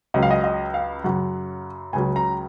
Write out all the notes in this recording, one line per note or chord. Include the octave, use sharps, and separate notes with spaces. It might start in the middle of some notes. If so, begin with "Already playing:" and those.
C#2 C#3 F#3 D#5
F5
D#5
D#5
F5
F#2 C#3 F#3 F#5
C#2 C#3 F#3 G#5
A#5